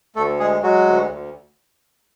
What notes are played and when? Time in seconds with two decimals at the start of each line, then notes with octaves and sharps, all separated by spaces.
0.15 D2 A3 A4
0.40 G#3 G#4
0.63 F#3 G#3 F#4
0.87 D2
1.10 D2